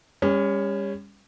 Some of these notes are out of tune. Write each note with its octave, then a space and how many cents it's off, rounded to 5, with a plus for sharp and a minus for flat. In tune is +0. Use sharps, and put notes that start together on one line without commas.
G3 +40 C#4 +0